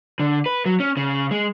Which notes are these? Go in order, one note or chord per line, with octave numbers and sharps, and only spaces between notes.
D3
B4
F#3
C#4
C#3
G#3